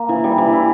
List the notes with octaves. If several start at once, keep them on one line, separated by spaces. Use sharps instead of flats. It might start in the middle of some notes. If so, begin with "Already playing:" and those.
Already playing: A#3
E3
G3
E3
E4